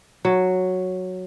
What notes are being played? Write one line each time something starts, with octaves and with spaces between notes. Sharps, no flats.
F#3